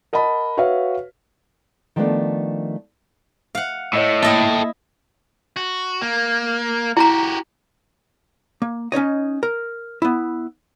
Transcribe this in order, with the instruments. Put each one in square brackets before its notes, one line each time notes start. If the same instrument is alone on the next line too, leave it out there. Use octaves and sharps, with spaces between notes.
[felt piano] A#4 D#5 F#5 A5 B5
F#4 B4 C#5 E5 F5
[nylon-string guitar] D#3 F3 G3 A3 B3 D4
[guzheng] F5 F#5
[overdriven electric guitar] A2 [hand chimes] C#5 D#5 E6
[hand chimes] A#3 [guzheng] E4 D#5 E5 [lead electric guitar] A4 G5
[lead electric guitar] F#4
A#3
[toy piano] E4 A#5 [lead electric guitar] F#4 G4
[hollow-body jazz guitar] A#3
C#4 D#4 C#5 D#5
A#4
B3 E4